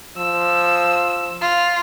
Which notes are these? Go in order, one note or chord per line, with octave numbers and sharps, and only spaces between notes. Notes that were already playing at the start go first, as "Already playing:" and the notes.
F3 E6
F4